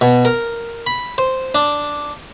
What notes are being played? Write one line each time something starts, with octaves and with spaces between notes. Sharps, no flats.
B2
A#4
B5
C5
D4